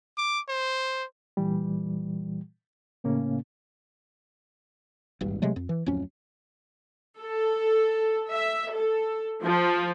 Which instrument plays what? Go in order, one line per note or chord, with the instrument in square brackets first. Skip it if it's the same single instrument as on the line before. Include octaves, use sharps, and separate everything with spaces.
[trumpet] D6
C5
[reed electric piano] A#2 E3 G3
A2 C#3 A#3 C#4
[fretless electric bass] D#1 G#1 G2
C3 F#3 G#3 A3
F2
E3
D1 F2 F#3 C#4
[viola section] A4
E5
A4
F3